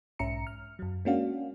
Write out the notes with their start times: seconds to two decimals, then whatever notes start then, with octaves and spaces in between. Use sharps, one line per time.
0.19 B1 G#2 C#4 E5 A#5 C#7
0.47 F6
0.79 F#2 F#3
1.05 G#3 A#3 C#4 D4 F#4 F5